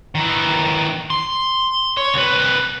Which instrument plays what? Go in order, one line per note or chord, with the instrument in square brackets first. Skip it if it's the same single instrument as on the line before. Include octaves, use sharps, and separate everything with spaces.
[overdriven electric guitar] D#3 E3
C6
C#5
C2 B4